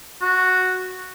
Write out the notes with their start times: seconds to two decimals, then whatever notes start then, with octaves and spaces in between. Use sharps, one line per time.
0.22 F#4